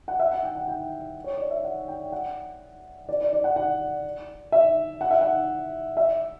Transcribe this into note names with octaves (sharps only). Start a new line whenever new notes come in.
F#5
E5
F#5
G5
F#5
G5
C#5
D5
E5
F#5
G5
F#5
D5
D5
D5
F#5
F#5
E5
F#5
E5
F#5
E5